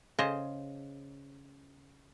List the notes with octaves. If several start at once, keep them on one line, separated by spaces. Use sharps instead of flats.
C#3 C5 D#5